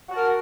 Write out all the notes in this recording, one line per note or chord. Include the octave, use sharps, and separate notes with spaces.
F#4 A#4 A5